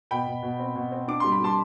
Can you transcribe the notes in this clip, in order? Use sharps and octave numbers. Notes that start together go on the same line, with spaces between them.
B2 G5 B5
B2
B2
C4
B2
C4
D4 D6
G3 C6
B5
G3 A5 C6